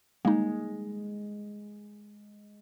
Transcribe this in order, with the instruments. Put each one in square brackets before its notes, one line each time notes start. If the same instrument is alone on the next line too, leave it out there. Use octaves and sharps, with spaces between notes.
[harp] G#3 [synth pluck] A#3 D#4